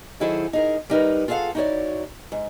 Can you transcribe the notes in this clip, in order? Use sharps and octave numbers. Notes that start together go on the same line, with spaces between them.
D#3 F#3 E4 G#4 A4 C5
D#4 G#4 A#4
G3 D#4 A#4 B4
F4 G#4 A4 C#5 F5 F#5
D#4 E4 F#4 G4 C#5 D5
G#2